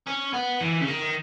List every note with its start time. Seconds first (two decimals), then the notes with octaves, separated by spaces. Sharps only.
0.07 C#4
0.33 B3
0.61 E3
0.81 C#3
0.88 D#3